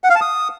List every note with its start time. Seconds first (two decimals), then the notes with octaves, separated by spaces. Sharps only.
0.04 F#5
0.10 F5
0.15 A5
0.21 D#6